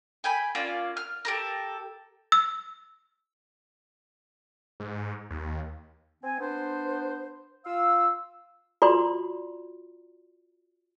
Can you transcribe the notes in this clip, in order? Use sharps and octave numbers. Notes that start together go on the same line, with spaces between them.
G5 G#5 B5
A#3 C#4 F4 D5
F6
G4 A4 A#4
E6
G#2
D#2
C4 G#5
B3 D4 C5
F4 F5 E6
F4 F#4 D5 A#5 C6